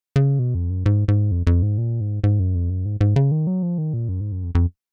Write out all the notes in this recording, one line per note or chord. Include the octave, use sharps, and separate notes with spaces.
C#3
B2
F2
F#2
G#2
G#2
F2
F2
G#2
A#2
G#2
G#2
F#2
F2
F#2
G#2
G#2
C#3
D#3
F#3
F3
D#3
A#2
F#2
G#2
F#2
F2
F2